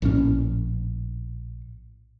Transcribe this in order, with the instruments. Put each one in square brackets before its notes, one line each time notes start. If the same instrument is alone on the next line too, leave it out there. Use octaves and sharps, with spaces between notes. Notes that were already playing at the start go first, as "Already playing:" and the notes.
[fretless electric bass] A#1 A2 D3 C#4